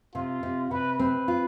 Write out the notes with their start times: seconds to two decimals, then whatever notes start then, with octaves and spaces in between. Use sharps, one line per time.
0.14 C3 F4
0.43 C3
0.71 C3 B4
1.00 C4 B4
1.28 F4